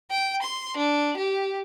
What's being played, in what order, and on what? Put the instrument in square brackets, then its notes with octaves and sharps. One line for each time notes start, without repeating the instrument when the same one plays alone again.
[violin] G5
C6
D4
G4